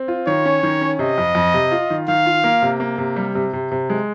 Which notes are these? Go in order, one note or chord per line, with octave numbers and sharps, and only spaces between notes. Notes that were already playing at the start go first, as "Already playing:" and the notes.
Already playing: C4
F4
D#3 C#5
C#4
D#3
C#4
C3 D#5
F2
F2
C3
F4
D#3
D#3 F5
F4
A#3
C3
A#3
C3
G3
C3
C3
C3
G#3